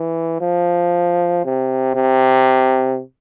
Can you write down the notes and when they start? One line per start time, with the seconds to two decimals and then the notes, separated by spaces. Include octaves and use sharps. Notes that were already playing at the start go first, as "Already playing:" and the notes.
Already playing: E3
0.41 F3
1.45 C3
1.95 C3